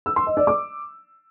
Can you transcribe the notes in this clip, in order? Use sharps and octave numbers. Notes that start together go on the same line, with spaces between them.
E6
C6
D#5
D5
D6